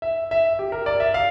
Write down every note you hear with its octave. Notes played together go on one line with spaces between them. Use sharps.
E5
E5
G4
A#4
D5
E5
F5